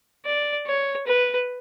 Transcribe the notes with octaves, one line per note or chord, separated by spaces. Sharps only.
D5
C#5
B4